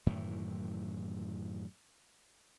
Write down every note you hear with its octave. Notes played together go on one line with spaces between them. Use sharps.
F#2 A2 D#3 E3